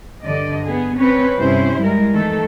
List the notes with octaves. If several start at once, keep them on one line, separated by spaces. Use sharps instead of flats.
G2 D3 D5 D#5
B3 G#4
C4 C#4 B4 C#5
G2 C3 C#4 E4 C5
G3 G#3 A#4
D#3 E3 A3 A4